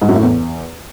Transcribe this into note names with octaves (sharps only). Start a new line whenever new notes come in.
G#2
F#2
A2
E2